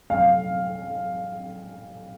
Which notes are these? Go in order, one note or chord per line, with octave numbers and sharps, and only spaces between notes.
F5